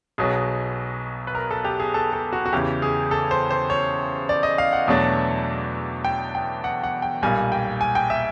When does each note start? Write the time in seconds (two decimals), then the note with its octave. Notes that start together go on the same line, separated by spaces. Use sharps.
0.18 B1 B2 F#3 G#4
1.27 B4
1.35 A#4
1.51 A4
1.65 G4
1.80 G#4
1.94 A4
2.13 A4
2.33 F#4
2.46 F#4
2.53 E2 C#3 E3 G4
2.82 G#4
3.11 A4
3.31 C5
3.51 C5
3.70 C#5
4.29 D5
4.43 D#5
4.58 F5
4.73 F#5
4.88 E2 B2 F#3 A3 D4
6.05 G5
6.35 G5
6.64 F#5
6.83 F#5
7.02 G5
7.22 B1 A#2 G3 A#3 G#5
7.52 G5
7.81 G#5
7.95 G5
8.10 E5